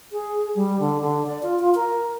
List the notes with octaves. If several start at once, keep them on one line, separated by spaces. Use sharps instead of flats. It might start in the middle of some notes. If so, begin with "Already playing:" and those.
G#4
G3
D3
D3
D5
F4
F4
A#4